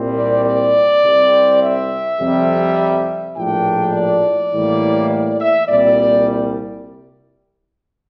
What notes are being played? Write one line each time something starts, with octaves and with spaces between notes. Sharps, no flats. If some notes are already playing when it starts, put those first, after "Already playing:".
Already playing: C2 A#2 G3 C4
D5
D5
C2 C3 G3 C4
E5
F2 C3 G3
A#1 A2 F3 A#3 D4 G5
D5
A2 E3 G3 A#3
D5
E5
C2 A#2 G3 D5